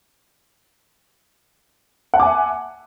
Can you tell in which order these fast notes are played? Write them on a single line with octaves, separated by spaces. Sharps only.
F#5 A5 D6 G#5 E5